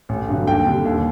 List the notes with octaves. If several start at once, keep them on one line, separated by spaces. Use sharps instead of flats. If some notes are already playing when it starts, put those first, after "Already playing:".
A1
G2 D3 F#3
D#2 G5
D3 G3
D#2